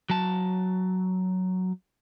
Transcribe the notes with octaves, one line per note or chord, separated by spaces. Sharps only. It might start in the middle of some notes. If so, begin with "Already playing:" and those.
F#3 A5